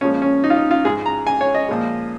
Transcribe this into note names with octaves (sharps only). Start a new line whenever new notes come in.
A#2 F3 G#3 C#4
C#4
D#4
F4
D#4
F4
G#2 G#3 G#4
A#5
G#5
C#5
D#5
A#2 F3 G#3